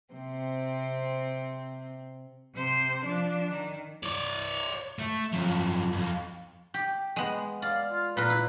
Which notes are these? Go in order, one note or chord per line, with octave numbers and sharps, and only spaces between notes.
C3 C4
C3 C5
F3 D4
D#3
C#5 D5
A3
F#2 F3
B1 F2
G4
G#3 B3
D5 F5
F4
A#2 A#4 B4
E4